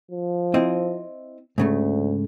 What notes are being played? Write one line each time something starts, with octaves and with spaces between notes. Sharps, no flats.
F3
C4 E4 D#5
D2 G#2 C#3 A3